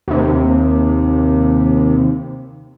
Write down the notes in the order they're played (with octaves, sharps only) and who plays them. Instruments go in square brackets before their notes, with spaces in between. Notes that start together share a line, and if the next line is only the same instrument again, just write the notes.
[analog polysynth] D#2 C3